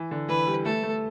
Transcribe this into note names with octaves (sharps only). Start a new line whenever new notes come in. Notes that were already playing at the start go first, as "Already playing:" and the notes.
Already playing: E3
D3
E3 B4
G3
A3 A4
A3